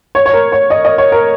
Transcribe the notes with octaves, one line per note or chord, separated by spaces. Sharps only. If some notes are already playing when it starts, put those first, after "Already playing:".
C#5
C#5
A#4
C#5
D#5
D#5
C#5
A#4